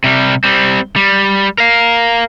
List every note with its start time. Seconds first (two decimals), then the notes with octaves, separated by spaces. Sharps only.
0.04 C3 G3
0.44 G3 C4
0.96 G3
1.58 A#4 F5